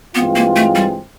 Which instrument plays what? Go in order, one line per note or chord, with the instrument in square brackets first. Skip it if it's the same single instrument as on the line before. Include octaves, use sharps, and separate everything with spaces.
[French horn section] G2 E3 G#3 C4 F4 [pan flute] B3
[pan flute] A#3
A3
G3